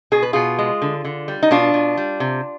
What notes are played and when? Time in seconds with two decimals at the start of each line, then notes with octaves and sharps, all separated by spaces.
0.12 B2 G#4
0.23 B4
0.33 B2 F4 G#4
0.59 G#3
0.82 D3
1.05 D3
1.28 G3
1.43 D#4
1.51 B2 D4 F4
1.74 B2
1.97 G3
2.20 C3